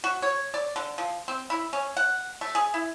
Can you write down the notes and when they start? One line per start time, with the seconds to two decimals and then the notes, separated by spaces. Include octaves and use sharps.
0.04 F#4
0.22 C#5
0.54 D5
0.76 D3
0.98 F3
1.28 C4
1.50 E4
1.73 C#4
1.97 F#5
2.41 A3
2.55 G#4
2.74 E4